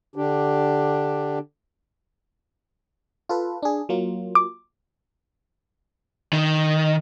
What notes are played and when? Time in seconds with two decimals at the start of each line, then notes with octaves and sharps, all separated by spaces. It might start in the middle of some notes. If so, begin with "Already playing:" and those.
0.16 D3 D4 G4
3.29 F4 A4 B4
3.63 D4 G#4
3.89 F#3 A#3 F4
4.35 D6
6.33 D#3